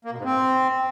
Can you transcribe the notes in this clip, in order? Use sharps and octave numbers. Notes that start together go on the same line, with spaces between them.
A#3
B2
G#2
C4